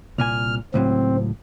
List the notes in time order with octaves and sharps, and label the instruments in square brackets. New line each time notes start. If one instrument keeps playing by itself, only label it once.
[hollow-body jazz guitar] C2 A#2 G#5 [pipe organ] F6
[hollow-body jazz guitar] C#2 A2 F#3 [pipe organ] C4